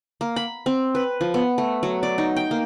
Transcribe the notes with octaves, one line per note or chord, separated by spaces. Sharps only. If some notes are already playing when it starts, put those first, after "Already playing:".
A#3
B5
C4
B4
F3
B3
A3
F#3
D5
D#4
G5
A#3